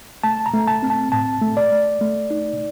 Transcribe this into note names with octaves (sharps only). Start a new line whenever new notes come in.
A3 A5
A#5
A3
A5
C4
A5
A2 A5
A3
D5
A3
A3
D#4